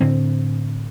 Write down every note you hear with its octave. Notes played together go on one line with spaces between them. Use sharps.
A2 D3 C4